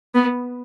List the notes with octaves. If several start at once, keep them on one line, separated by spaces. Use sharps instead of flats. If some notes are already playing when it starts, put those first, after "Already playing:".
B3